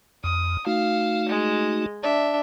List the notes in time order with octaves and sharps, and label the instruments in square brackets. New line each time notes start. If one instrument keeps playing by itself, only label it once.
[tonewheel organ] F2 [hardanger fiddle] D#6
[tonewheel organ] A3 D#4 F#4 [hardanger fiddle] F5
[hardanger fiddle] G#3
D4 E5